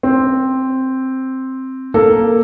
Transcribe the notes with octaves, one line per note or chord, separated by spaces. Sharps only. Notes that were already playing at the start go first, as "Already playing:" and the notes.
C4
A#3 A4 A#4